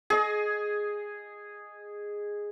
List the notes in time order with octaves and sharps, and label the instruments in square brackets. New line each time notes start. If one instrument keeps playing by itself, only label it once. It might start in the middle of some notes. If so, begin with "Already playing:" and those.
[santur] G#4 D#5